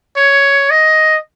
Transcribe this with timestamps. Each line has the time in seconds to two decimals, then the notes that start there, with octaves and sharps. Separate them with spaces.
0.17 C#5
0.70 D#5